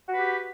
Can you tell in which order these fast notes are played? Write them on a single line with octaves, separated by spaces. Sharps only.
F#4 B4 G4